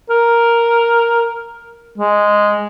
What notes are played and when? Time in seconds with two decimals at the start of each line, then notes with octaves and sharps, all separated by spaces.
0.10 A#4
1.98 G#3